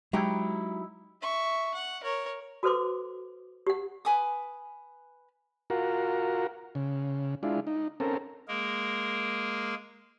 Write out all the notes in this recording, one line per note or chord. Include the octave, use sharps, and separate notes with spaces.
F#3 G#3 D#4 E4 G4
E5 C#6
F#5
A#4 C#5
F#4 A4 B4 C5 C6 D6
G4 F#5
B4 G#5 D6 D#6
F4 F#4 A#4
C#3
G#3 D4 E4 F4
D#4
C4 C#4 A4 A#4
G#3 A#3 G#4 A#4